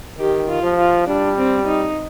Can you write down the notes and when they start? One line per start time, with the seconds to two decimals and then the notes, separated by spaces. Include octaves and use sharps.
0.19 D#3 G4
0.49 F4
0.63 F3
0.78 F4
1.07 G3 D4
1.38 C4
1.67 D#4